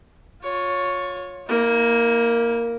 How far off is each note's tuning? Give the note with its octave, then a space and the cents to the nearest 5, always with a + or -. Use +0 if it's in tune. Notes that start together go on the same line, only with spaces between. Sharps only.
F4 +30 C#5 +0
A#3 +0 E4 -45